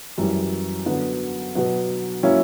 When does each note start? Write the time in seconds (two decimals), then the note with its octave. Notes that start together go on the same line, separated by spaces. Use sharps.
0.18 F#2 E3 G3
0.86 D3 F#3 B3
1.55 B2 F#3 B3
2.23 F#3 A#3 C#4 E4